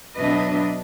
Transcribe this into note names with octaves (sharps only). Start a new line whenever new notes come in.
B2 F#3 D4 B4 D#5 E5